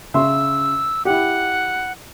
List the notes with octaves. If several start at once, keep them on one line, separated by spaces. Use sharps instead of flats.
C#3 E5 C6 E6
E4 G4 F#5